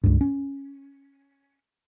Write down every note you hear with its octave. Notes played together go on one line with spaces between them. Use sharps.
C#2 G2
C#4